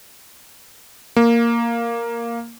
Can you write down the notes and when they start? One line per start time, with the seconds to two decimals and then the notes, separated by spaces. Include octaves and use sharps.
1.16 A#3